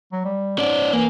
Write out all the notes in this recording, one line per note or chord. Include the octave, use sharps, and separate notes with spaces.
F#3
G3
G#2 C#4 D5
E3 A#3